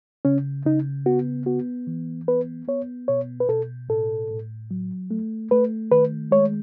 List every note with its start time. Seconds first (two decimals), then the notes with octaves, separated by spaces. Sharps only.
0.25 C#3 C#4
0.66 C#3 D#4
1.06 B3 F#4
1.46 B3 F#4
1.87 E3
2.28 B3 B4
2.68 B3 C#5
3.08 B2 C#5
3.40 B4
3.49 B2 A4
3.89 A2 A4
4.30 A2
4.71 F#3
5.11 A3
5.51 A3 B4
5.91 D#3 B4
6.31 G#3 C#5